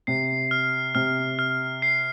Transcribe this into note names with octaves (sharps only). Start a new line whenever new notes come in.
C3 C7
F6
C3 F6
F6
C7